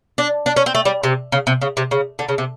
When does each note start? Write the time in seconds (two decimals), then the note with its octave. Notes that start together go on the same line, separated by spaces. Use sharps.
0.18 D4
0.46 D4
0.56 C#4
0.66 C4
0.75 A3
0.85 G3
1.03 C3
1.32 C#3
1.47 C3
1.61 C#3
1.77 C3
1.91 C#3
2.19 D3
2.29 C#3
2.38 C3